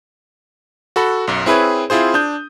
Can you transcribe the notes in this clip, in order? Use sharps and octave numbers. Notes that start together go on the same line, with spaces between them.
F#4 A4 B5
B1 F#2
C4 E4 G#4 B4 C#5
C4 E4 F4 G#4 C5
D4 D#6 G6